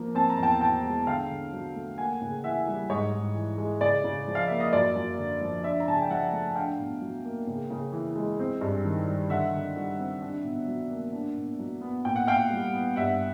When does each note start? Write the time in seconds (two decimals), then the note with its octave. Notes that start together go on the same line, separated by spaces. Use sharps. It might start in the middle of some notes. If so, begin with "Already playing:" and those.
Already playing: F3 A#3
0.15 C4 A5
0.30 A#5
0.38 E2 G5 A5
0.61 B2 G5 A5
0.84 G#3
1.07 D3 F5 G5
1.30 D3
1.53 F#3
1.76 A3
1.98 A#3 F#5 G#5
2.22 C#3
2.44 E3 E5 F#5
2.67 G3
2.90 G#2 C#5 D#5
3.13 G#2
3.35 E3
3.58 G#3
3.81 C#3 D5
4.04 C#3
4.28 F3
4.35 F5
4.47 A#3 E5
4.60 D#5
4.73 F#2 D5
4.96 F#2
5.18 D3
5.41 F3
5.64 D4 D5 E5
5.80 A#5
5.87 C#3 A5
5.94 G#5
6.02 G5
6.10 F3 E5 F#5
6.32 A3
6.56 D4 F5 G5
6.79 B2
7.02 F#3
7.25 A#3
7.47 C#3
7.70 C#3
7.93 E3
8.16 G#3
8.40 C4
8.61 G2
8.85 D#3
9.08 G3
9.30 D3 E5 F#5
9.53 D3
9.77 G3
10.00 C4
10.22 D4
10.44 B2
10.68 F#3
10.91 A#3
11.13 D4
11.37 B2
11.59 F#3
11.81 B3
12.05 A#2 G5
12.16 F#5
12.27 A#2 F5 G5
12.51 G3
12.73 B3
12.96 G2 E5 F#5